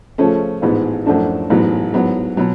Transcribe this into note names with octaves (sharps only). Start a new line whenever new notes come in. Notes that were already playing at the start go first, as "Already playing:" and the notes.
C#3 F3 A3 C#4
A1 G#2 G#3 B3
F#2 F3 A3 D4
A1 G#2 F#3 B3
G#2 F#3 B3
B2 F#3